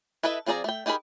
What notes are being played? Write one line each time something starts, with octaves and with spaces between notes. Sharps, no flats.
E4 A4 B4 D#5 E5
F3 C4 G#4 D5 A#5
A3 G5
D#4 G4 G#4 A#4 B5